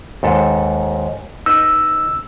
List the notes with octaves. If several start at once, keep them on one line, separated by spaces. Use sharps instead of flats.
D#2 G#2 A4
D#4 B4 D#5 E6